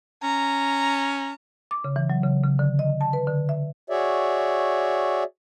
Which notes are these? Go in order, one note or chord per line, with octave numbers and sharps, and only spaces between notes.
C#4 A#5
D6
C#3
E3
F#3
C#3
C#3
D3
D#5
A5
B4
D3
E5
F#4 G#4 C#5 D5 E5